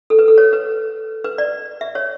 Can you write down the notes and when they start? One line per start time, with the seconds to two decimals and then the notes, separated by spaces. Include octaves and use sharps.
0.10 A4
0.19 B4
0.28 A4
0.38 C#5
0.53 B4
1.24 B4
1.38 D5
1.81 E5
1.95 C#5